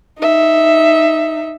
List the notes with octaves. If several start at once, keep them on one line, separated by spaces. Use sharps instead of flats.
D#4 E5